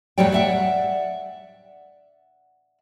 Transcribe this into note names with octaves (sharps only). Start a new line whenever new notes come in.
A2 F#3 G3 C#5 D5 G5
D5 E5 F#5